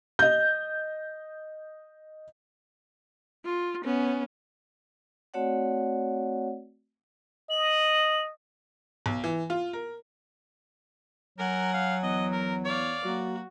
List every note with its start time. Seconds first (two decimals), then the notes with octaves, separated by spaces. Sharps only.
0.19 D#5 G6
3.45 F4
3.84 B3 C#4
5.34 A3 C4 F#4 C#5 D5 F#5
7.50 D#5 F#7
9.06 B1
9.24 E3
9.50 F4
9.73 A#4
11.38 F#3 A#4 F#5 G#5
11.73 F5
12.03 E2 D#5
12.32 A#4
12.65 C#5 D5 F5
13.05 F#3 A#3 F#4